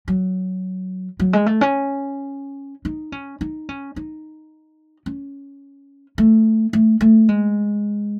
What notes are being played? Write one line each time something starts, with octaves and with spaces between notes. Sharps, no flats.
F#3
F#3
G#3
A3
C#4
D#4
C#4
D#4
C#4
D#4
C#4
A3
A3
A3
G#3